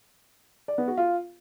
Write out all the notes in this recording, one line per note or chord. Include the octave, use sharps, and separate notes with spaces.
D5
B3
F#4
F4